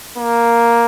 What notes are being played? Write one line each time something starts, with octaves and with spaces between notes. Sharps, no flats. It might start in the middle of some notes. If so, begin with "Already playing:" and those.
A#3